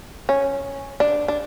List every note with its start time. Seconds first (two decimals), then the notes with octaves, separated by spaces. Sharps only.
0.29 C#4
1.00 D4
1.28 D4